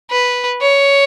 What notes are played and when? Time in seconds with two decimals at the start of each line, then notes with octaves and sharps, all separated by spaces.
0.11 B4
0.62 C#5